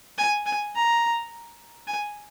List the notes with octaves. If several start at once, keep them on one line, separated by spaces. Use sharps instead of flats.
G#5
G#5
A#5
G#5